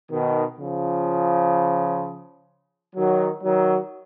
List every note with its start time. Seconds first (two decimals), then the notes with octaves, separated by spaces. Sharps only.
0.11 B2 D#3
0.58 C#3 F3
2.96 D#3 F#3
3.43 D#3 F#3